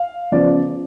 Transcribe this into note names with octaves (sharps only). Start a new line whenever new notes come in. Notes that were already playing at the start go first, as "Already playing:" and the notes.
Already playing: F5
C#3 F3 B3 D5